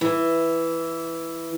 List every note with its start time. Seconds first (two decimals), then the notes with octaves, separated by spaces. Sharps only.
0.01 E3